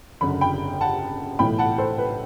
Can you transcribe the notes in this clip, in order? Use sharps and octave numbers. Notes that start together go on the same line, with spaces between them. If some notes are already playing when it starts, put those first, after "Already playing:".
F#1 F#2 D3 B5
G5 B5
F#5 A5
B1 A2 E3 G5 B5
F#5 A5
A4 C5
B4